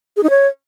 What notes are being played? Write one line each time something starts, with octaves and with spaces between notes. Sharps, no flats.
G#4
D#4
C#5